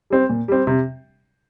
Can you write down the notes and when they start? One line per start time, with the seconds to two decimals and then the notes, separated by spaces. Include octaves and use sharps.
0.10 G3 C4
0.29 A#2
0.48 G3 C4
0.67 C3